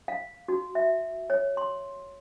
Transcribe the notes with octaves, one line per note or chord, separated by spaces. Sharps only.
F5
F#4
E5
C#5
C6